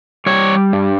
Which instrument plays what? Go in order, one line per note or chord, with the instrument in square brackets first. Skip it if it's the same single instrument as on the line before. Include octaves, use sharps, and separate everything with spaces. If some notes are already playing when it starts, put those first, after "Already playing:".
[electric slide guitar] G3 C#5
G2